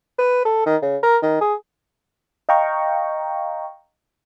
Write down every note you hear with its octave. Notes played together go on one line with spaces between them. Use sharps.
B4
A4
D#3
C#3
A#4
D#3
G#4
D#5 F5 G5 A#5 C#6